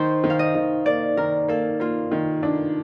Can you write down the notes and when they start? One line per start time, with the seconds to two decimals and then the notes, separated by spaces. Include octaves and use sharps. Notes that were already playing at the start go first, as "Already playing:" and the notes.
Already playing: D#3 C5
0.24 D#3
0.30 F5
0.39 D#5
0.55 D#3
0.86 A#3 D5
1.17 D#3 A#4
1.48 A#3 A4
1.80 A#3 F4
2.12 D#3
2.43 D4